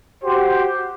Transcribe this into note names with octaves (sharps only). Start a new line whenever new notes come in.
F#4 G4 C5